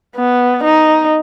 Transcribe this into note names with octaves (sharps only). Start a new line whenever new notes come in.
B3
D#4